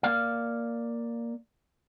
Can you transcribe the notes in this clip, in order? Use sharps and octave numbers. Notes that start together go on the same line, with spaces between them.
A#3 D5 F5